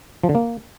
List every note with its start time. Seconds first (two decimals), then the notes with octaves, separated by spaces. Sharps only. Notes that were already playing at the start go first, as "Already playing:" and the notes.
0.23 F3
0.29 D3
0.35 A#3